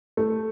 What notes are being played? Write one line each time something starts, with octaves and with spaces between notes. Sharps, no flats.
A3